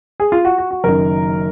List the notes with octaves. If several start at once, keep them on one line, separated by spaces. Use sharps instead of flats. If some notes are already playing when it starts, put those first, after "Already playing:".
G#4
F4
F#4
F#4
F#4
F#1 F#2 D#3 A#4